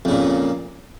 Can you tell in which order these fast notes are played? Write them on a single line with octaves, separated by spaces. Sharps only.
F2 C#3 A#2